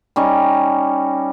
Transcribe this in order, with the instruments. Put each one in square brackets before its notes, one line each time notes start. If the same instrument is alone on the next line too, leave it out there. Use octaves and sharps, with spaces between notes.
[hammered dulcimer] G3 C#4 D#4